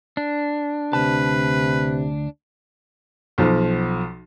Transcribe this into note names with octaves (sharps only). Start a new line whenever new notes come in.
D4
D2 C3 B4 A5
B1 F3